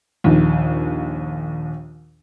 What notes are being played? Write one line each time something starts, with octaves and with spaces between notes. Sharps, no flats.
A#1 D#2